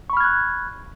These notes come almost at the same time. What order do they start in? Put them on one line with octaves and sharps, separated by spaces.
C#6 B5 F6 G#6 F#6